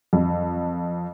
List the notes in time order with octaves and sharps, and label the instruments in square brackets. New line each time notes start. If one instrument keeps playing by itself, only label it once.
[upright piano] F2